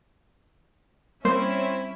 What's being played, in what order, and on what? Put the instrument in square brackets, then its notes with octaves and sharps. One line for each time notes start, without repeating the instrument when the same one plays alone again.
[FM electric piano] G3 [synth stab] A#3 C5 [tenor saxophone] C4 [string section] C#4 E4 E5